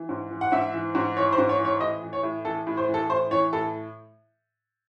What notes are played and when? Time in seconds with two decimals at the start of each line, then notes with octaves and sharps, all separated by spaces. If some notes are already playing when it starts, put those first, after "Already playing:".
Already playing: E3
0.09 G#2
0.31 E3
0.41 F#5
0.52 G#2 E5
0.74 E3
0.95 G#2
1.17 E3 C#5
1.32 C5
1.38 G#2
1.49 C#5
1.59 E3
1.65 C#5
1.80 A2 D#5
2.03 E3
2.13 C#5
2.23 A2
2.45 E3 A4
2.67 A2
2.77 C5
2.89 E3
2.94 A4
3.10 A2 C5
3.31 E3 C#5
3.53 A2 A4